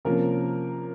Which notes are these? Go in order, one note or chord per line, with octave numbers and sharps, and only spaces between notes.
C3 F3 A#3 C#4 A#4